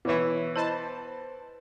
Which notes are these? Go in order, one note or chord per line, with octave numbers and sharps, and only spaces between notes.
B2 E3 E4 B4 C#5 E5 D6
E4 C5 D#5 A5 B5